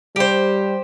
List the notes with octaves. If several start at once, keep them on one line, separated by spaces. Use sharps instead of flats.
G3 G4 C5